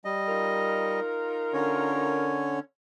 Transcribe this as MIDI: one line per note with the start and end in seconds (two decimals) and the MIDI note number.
0.05 1.00 55
0.05 1.00 75
0.28 2.42 63
0.28 2.42 65
0.28 2.42 70
1.53 2.59 50
1.53 2.59 61
1.53 2.59 73